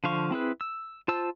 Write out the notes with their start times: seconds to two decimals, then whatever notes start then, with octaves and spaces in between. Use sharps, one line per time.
0.04 D3 F3 C5 F5 C#6
0.31 C4 E4 G#4 B4
0.61 E6
1.08 F4 C5 A5 E6